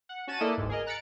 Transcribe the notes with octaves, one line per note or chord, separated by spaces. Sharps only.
F#5
C#4 F#4 A5 A6 D#7 E7
A#3 E4 A4 B4 D5 D#5
G1 D2 G#2
G#4 A#4 D#5
A#5 F#6 A6 B6 C#7 D7